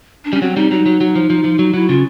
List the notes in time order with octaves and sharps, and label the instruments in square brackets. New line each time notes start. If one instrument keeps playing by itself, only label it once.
[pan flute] D4
[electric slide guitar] G3 [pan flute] C#4
[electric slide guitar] F#3 [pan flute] C4
[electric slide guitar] G3 [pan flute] D#4
[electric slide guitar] F#3 [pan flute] D#4
[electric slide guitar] F#3
F#3
F3
F3
F3
F#3
[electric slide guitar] F#3 [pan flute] E4
[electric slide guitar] C#3 [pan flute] F4